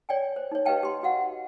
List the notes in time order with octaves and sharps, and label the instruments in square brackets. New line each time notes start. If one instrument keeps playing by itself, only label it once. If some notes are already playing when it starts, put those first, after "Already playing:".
[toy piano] C#5 D5 G5 G#5
C5
D#4 C#5
G4 B4 D#5 F5 G5 A5
G4 C6
F#4 D#5 F5 F#5